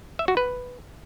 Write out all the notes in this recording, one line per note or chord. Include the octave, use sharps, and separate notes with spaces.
E5
F#4
B4